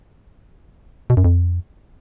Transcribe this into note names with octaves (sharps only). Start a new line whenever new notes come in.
B2
F#2
F2